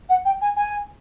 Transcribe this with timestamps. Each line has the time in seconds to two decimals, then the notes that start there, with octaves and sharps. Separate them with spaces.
0.09 F#5
0.25 G5
0.41 G#5
0.56 G#5